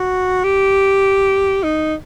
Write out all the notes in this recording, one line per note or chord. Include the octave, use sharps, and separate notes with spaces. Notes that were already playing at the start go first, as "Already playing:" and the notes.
Already playing: F#4
G4
D#4